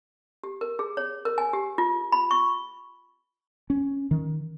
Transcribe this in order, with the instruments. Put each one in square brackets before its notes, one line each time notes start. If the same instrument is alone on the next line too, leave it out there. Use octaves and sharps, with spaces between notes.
[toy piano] G4
A#4
G#4
C#5
A#4
G#5
G4
F4
B5
C#6
[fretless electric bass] C#4
D#3